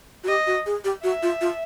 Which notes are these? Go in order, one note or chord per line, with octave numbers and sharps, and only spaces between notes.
F#4
G4 D#5
F#4
G#4
G4
F#4 E5
F4
F4